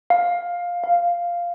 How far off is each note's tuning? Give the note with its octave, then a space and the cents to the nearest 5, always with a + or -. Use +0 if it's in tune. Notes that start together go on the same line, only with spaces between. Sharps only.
F5 +10
F5 -5